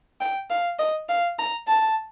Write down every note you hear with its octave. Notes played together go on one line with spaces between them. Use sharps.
G5
F5
D#5
F5
A#5
A5